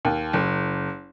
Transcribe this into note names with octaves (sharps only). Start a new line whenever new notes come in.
D#2
F#1